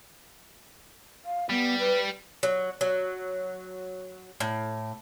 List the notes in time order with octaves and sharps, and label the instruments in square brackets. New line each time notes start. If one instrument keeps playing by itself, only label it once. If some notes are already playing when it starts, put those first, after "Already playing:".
[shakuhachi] F5
[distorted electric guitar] G3 [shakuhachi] B3
[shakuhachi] B4
[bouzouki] F#3
F#3
A2